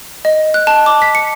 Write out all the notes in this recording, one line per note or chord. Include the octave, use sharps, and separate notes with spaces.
D#5
F#6
A5
D6
B6
C#7